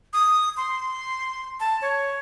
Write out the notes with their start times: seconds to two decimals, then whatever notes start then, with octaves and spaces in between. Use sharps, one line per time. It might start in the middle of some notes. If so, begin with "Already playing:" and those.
0.13 D#6
0.57 C6
1.60 A5
1.82 C#5